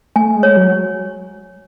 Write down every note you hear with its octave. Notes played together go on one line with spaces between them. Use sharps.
A3 G#5
G#3
C#5
F#3